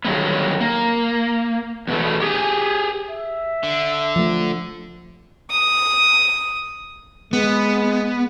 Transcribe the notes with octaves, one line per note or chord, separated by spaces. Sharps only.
D3 D#3 F#3 G3 A#3 B3
A#3
E2 B2 A3
G4 G#4 G#5
E5
D3
F3 A3
D#6
G#3 B3